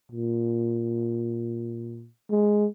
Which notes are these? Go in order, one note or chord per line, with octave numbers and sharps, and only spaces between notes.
A#2
G#3